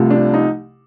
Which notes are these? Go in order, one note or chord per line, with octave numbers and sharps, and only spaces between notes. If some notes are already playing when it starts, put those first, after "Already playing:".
Already playing: C2 C3 F3 A3
D4
D#4